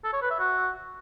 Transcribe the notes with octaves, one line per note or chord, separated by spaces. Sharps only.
A4
C#5
B4
E5
F#4